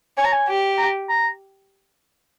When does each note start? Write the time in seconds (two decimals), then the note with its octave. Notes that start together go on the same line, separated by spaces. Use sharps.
0.17 C#5 G#5
0.25 A#5
0.32 G#5
0.48 G4
0.78 A#5
1.09 A#5